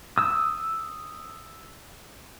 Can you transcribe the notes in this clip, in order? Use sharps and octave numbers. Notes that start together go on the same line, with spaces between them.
D#6 E6